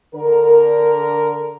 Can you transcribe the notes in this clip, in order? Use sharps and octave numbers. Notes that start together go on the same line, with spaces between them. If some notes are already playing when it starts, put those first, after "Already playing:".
D3 A#4